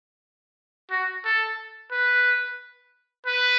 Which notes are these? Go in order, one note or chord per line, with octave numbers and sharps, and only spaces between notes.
F#4
A4
B4
B4